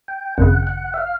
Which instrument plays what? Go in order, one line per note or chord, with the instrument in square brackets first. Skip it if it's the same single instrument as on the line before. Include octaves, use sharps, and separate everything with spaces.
[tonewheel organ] G5
[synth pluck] G#1 F#2 C#3 [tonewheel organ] F#5
[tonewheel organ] F#5
E5
F5